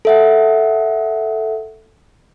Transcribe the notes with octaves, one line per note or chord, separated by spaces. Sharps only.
A4 E5 F#5